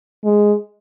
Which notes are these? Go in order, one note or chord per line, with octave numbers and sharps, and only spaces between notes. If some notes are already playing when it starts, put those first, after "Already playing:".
G#3